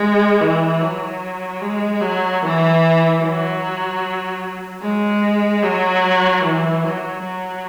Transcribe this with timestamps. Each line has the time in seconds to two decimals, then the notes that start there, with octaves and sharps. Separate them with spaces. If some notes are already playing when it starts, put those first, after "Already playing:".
Already playing: G#3
0.41 E3
0.81 F#3
1.61 G#3
2.01 F#3
2.42 E3
3.21 F#3
4.82 G#3
5.62 F#3
6.44 E3
6.84 F#3
7.24 F#3